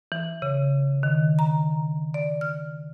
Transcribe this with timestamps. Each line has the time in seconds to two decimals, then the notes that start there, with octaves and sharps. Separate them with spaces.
0.12 E3
0.42 C#3
1.03 D#3
1.39 A#5
2.14 D5
2.41 F6